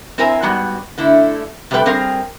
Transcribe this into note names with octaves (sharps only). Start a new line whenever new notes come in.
C4 E4 A#4 C5 G#5 A#5
G#2 G3 B3 F#4
D3 A3 E4
C3 G3 A3 A#4 B4 G5
G3 C4 G#4 A#4 F5